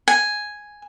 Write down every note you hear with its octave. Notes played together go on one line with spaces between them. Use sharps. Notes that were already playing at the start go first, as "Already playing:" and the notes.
G#5